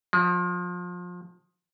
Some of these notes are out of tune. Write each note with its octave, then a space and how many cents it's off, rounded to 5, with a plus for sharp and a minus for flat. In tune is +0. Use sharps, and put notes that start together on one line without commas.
F3 +30